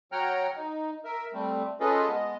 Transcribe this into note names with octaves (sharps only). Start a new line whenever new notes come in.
F#3 C#5 F#5 G5 A#5 F6
D#4
A#4 E5
G3 A3 C4
C#4 F4 G#4 A4 B4 D#5
G#3 B3 D#5